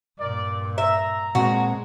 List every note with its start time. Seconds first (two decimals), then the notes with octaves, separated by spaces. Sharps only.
0.20 G2 A#2 A#4 D5
0.78 E5 A#5
1.35 A#2 G#3 C4 F#4 F#5